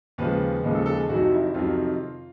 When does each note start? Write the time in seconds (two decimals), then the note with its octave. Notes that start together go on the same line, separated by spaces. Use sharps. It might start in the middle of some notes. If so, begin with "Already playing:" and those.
0.18 D#2 C#3 F3 G#3 B4
0.63 D#2 C#3 F3 G#3
0.75 A4
0.86 A4
0.98 G#4
1.09 F2 C3 D#3 F#3 F#4
1.31 E4
1.54 F2 C3 D#3 F#3 F4